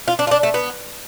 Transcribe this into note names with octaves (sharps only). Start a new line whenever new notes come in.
F4
D4
F4
D4
A3
B3